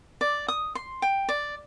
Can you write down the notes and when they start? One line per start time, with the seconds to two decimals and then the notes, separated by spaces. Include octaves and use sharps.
0.21 D5
0.48 D#6
0.75 C6
1.02 G5
1.29 D5